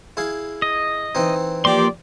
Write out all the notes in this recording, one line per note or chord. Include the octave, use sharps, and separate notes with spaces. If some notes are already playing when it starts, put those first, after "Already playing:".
E4 G#4 F5
D#5
E3 C4 D#4
F3 A#3 G4 D5 C6